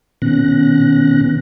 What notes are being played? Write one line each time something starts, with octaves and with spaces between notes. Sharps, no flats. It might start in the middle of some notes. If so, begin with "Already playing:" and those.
B2 D#3 B3 C#4 F#6 A#6